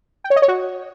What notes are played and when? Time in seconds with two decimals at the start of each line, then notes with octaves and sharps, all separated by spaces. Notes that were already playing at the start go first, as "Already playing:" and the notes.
0.24 G5
0.30 C#5
0.36 D#5
0.42 C#5
0.48 F#4